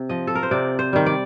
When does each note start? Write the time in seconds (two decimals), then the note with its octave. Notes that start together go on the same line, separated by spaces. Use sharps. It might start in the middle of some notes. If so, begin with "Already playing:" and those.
Already playing: C3
0.09 F3 D#5
0.27 A4
0.35 A#4
0.43 C5
0.51 C3 D5
0.79 C5
0.93 D#3 G3
1.06 D5